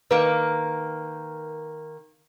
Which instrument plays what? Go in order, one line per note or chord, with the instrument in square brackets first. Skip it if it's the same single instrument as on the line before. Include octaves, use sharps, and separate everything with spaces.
[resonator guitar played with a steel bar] D#3 A#3 [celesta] B4